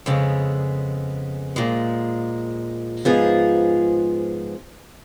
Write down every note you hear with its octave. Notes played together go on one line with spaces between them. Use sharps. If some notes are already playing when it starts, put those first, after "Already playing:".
F2 C#3 G#3 B3
A#2 F3 G#3
G#2 F3 B3 F4 G#4